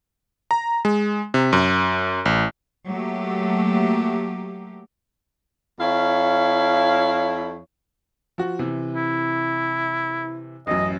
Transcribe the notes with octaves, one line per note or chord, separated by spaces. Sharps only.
A#5
G#3
C3
F#2
A1
F#3 A3 A#3 G4
F2 E4 C#5 F5
F3 F#4
C3 E3
E4
A1 F#2 D#5